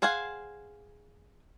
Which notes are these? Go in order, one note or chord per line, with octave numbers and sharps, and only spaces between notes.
G#4 C5 F5 F#5 G#5